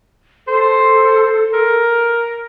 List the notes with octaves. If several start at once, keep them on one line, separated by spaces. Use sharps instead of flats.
A4 C5
A#4